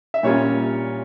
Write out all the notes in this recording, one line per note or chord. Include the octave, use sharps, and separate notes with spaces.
E5
A#2 G3 C#4 F4 C#5